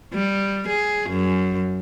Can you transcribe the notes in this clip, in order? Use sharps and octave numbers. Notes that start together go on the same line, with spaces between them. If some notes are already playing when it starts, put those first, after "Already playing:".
G3
G#4
F#2